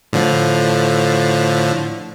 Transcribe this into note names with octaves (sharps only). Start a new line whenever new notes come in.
A2 D3 F3